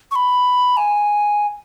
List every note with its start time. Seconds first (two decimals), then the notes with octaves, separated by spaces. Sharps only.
0.11 C#6
0.16 B5
0.77 G#5